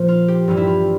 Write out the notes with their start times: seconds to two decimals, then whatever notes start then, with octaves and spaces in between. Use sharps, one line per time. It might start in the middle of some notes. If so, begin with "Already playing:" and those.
Already playing: A#2 F3
0.08 F4
0.28 G4
0.47 G2 E3 G3 F4
0.57 E4
0.67 F4